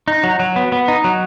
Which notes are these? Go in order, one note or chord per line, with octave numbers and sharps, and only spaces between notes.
D#4
F#3
F#3
B3
B3
D#4
F#3